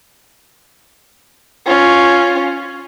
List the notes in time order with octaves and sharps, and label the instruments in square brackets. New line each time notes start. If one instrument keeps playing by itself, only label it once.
[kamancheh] C#4 F4